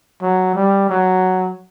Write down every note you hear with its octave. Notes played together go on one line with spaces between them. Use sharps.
F#3
G3
F#3